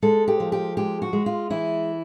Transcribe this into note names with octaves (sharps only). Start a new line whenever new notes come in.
G#3 A4
G4
F3
G4
G#3 G4
F#4
G#3
F4
E3 E4